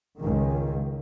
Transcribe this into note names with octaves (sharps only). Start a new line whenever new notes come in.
C#2 D#3